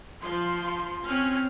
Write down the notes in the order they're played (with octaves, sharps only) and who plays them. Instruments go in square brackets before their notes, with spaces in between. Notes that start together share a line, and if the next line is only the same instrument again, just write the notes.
[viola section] F3 C6
[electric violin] C4 F6 [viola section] C#4